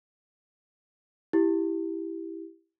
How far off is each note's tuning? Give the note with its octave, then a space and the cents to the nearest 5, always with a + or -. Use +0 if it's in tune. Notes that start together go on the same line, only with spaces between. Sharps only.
E4 +0 G4 +0